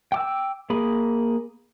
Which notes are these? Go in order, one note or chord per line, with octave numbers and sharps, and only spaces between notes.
G5 D6 E6
A#3 G#4 B5